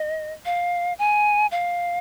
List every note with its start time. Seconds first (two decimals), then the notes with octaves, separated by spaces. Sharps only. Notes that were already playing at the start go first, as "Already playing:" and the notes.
Already playing: D#5
0.46 F5
0.99 G#5
1.51 F5